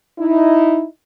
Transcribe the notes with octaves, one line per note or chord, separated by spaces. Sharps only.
D#4 E4